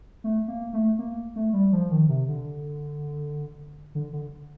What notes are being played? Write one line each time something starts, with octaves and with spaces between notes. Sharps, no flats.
A3
A#3
A3
A#3
A3
G3
F3
D#3
C3
D3
D3
D3